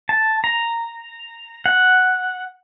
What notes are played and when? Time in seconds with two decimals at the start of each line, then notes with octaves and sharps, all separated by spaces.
0.09 A5
0.44 A#5
1.66 F#5